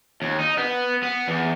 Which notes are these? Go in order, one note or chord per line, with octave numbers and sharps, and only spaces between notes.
D#2
D#4
B3
B3
E2